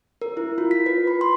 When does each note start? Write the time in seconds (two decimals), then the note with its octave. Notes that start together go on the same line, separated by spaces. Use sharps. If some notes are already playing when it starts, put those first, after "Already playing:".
0.22 A#4
0.37 E4
0.58 F4
0.71 B6
0.86 B4
1.07 B5
1.21 C6